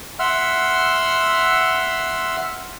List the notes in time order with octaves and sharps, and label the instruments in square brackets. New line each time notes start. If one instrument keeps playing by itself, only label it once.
[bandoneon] E5 F#5 C6 E6 F6